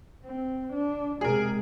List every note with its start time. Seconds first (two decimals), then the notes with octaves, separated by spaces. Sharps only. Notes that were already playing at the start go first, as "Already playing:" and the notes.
0.24 C4
0.72 D4
1.21 C3 G#3 G#4 A#4